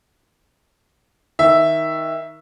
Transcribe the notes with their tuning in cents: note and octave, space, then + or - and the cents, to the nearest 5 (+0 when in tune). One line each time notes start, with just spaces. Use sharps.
D#3 +20 E5 +0